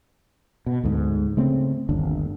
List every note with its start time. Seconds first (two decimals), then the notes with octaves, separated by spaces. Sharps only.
0.66 B2
0.84 D2 G#2
1.37 C#3 A3 C4
1.89 G1 D#2 D4